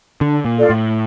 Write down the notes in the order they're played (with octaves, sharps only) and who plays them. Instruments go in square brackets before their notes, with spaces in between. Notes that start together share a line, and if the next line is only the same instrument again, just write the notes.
[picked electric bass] D3 [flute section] D4
[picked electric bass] A#2
[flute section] F4 A4 D5
[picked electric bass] A2